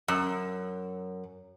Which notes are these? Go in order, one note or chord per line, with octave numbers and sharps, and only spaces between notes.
F#2